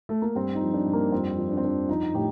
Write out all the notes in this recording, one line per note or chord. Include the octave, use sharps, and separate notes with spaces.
A3
A#3
G2 C4
D#4
F3
D4
G2
A#3
F2 C4
F3
D4
C4
F2 D4
F3 D#4
A2 G4